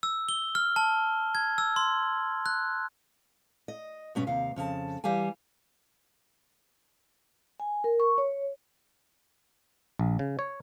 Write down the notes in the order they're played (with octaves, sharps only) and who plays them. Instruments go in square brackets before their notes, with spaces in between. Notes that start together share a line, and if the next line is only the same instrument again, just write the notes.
[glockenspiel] E6
G7
F6
A5
G#6
E6
C6
F#6
[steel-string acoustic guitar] D#5
G2 B2 C#4
D#2 C3 F5
F2 C#3 G4 A5
E3 G3 G4 F5 G#5
[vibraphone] G#5
A#4
C#6
C#5
[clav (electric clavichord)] A#1
C#3
C#5